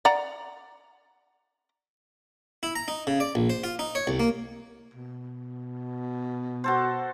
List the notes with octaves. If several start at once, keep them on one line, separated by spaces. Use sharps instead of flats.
D5 F#5 A#5
E4
A#5
D#4
C#3
D5
A#1
C5
F4
D#4
C#5
C2
A#3
B2
F#4 A4 C5